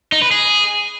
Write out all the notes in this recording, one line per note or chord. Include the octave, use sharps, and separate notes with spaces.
D#4
B4
G#4